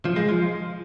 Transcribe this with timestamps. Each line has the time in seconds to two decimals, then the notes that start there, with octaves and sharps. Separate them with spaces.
0.05 F3
0.16 G#3
0.29 F3